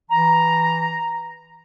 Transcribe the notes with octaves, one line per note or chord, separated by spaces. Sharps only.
E3 A#5